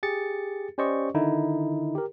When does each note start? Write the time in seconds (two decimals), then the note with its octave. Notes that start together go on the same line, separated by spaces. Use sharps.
0.03 G4 G#4 A6 C#7
0.78 C#4 G4 C5 D5 D#5 C#6
1.14 D3 D#3 D#4 E4
1.95 G4 A#4